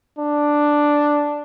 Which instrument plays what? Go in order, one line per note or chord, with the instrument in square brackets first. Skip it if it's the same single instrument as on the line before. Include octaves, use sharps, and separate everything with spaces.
[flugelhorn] D4